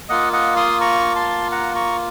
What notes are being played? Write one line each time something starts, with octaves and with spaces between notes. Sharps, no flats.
A#3 F4 D#5 F#5
D#5 F#5
C6 D#6
A#5 C#6
A5 C6
F#5 A#5
A#5 C#6